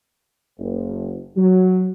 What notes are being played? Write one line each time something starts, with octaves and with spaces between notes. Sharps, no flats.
F#1
F#3